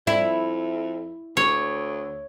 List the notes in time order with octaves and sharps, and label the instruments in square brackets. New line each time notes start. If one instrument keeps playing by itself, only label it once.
[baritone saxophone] F2 [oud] E4
[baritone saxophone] D2 [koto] C#5